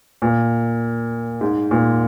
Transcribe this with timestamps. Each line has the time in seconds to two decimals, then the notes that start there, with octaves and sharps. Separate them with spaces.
0.22 A#2
1.41 G#2
1.71 A#2